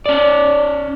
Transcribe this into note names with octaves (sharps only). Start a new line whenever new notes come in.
C#4 D5